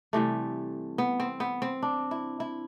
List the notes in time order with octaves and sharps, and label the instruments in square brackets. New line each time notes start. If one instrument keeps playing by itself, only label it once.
[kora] C3 E3 G3 A3
B3
C4
B3
C4
D4
E4
E4